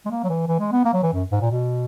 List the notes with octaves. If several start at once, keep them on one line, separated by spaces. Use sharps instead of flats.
G#3
A#3
F#3
E3
E3
G#3
B3
A#3
F#3
E3
F#2
G#2
A#2
B2